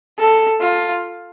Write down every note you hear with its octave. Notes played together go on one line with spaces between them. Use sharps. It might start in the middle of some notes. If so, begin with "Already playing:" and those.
A4
F4